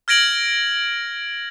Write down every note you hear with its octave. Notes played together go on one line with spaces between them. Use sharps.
F6 G#6 A#6 D7 F#7